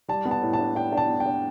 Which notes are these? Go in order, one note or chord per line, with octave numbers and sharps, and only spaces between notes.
G3 A5
B3
A5
A2
A5
D4
D4 G5
D4 A5
B3
G5
D4